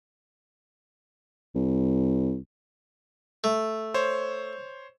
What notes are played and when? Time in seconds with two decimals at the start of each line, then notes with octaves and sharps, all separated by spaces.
1.55 C2
3.44 A3
3.94 C5 C#5